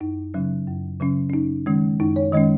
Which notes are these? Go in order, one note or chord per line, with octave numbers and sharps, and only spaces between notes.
F#2 D#4
C#3 F#3 C#4
F#2
C#3 F#3 C#4
C#4
F#2 D#4
D#3 G#3 C#4
F#2 D#4
C#5
D#3 G#3 C#4 D#5